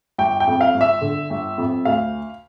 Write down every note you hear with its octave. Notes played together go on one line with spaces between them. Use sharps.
G1 G5
G5
F2
F5
G1
E5
D3
G1
F2
D2 F5